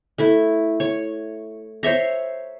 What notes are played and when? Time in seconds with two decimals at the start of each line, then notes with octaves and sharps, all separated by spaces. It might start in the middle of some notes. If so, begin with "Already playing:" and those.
0.18 A3 E4
0.80 C#5
1.83 C5 C#5 E5 A#5